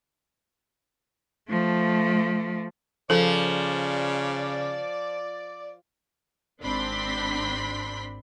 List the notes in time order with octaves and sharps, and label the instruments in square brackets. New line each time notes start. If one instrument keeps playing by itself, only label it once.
[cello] F3 A3
[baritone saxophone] C#3 [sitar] F3 [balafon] A4 [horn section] D5
[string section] G#1 C4 D4 B5 C6 B6